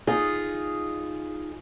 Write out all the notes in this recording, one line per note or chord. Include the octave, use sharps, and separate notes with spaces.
D#4 F4 G#4